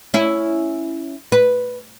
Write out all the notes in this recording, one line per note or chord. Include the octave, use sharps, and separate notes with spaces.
C#4 E4
B4